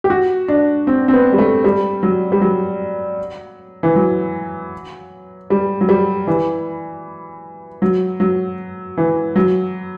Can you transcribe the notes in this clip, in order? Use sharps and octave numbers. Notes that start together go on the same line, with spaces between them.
G4
F#4
D4
C4
C4
B3
G3
A3
G3
F#3
G3
F#3
E3
F#3
G3
F#3
G3
E3
F#3
F#3
E3
F#3